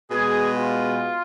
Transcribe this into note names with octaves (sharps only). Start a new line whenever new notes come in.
B2 G#3 G#4
F4